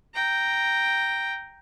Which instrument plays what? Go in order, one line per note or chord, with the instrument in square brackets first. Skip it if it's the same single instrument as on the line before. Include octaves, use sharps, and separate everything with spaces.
[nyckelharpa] G5 A#5